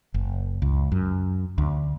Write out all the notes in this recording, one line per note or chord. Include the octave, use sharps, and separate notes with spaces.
F#1
C#2
F#2
D2